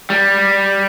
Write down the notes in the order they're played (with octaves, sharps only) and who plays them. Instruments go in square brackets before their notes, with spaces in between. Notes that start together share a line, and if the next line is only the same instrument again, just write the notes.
[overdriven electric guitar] G3